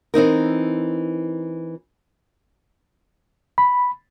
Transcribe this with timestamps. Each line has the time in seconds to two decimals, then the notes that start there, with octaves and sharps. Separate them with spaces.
0.14 E3 C4 D#4 A#4
3.58 B5